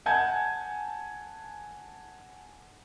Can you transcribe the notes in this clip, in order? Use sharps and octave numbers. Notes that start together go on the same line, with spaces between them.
F#5 G#5 A5 G6 G#6